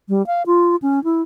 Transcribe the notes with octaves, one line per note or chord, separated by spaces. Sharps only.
G3
F5
F4
C#4
E4